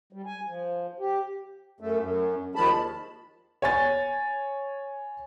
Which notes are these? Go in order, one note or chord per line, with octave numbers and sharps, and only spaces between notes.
G3
G#5
F3
G4
F#2 A3
F#2
D#2 D#3 F3 G#3 A5 B5
C#5 G#5 A6